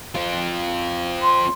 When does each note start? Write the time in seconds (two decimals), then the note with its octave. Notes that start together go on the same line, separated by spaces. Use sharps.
0.15 C4 F4
1.22 C6